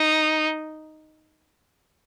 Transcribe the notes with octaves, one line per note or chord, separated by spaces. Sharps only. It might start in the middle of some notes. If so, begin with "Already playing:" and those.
Already playing: D#4